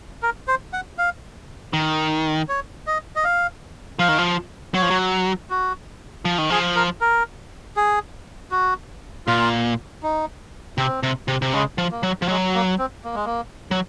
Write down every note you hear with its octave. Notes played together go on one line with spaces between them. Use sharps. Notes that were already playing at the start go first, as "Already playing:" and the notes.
A#4
C5
F#5
F5
D#3
C#5
D#5
D#5
F5
F3 F5
D#3
F3
F#3 C#5
F3
F#3
F#4
F3
D#3
F3 G#4
A#4
A#4
G#4
F#4
A#2 F4
D#4
C3 C4
C3
C3
C3
C#3 G#3
F3
A#3
F#3
F3
F#3 G#3
A#3
C4
A#3
G#3
A#3
F#3